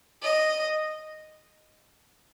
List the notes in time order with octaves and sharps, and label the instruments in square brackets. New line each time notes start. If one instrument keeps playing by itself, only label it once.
[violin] D#5